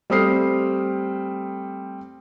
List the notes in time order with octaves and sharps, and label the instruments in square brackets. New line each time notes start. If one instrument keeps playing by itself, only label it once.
[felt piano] G3 A3 C4 D#6 F6 C7